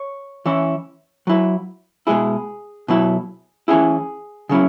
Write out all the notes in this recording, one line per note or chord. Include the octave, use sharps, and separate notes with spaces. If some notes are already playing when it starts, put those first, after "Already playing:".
Already playing: C#5
E3 C#4 E4
F#3 E4
B2 G#3 E4 G#4
B2 F#3 E4
E3 C#4 E4 G#4
C#3 F#3 C#4 E4